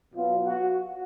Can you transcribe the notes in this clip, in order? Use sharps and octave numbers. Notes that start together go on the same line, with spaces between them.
B2 F#3 B3 F4
F#4